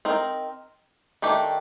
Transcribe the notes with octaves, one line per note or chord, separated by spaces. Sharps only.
C4 D#4 A#4
D#3 A3 D4 G4